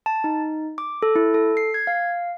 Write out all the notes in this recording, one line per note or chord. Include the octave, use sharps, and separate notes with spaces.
A5
D#4
D6
A4
E4
A4
C7
G#6
F5